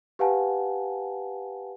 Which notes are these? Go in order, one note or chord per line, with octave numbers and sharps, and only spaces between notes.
G4 B4 F5 F#5 G#5 A5